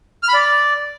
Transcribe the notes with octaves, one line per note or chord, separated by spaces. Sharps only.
F6
B5
D5